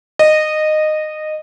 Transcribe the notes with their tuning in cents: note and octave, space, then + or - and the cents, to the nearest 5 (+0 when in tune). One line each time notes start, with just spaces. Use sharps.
D#5 -15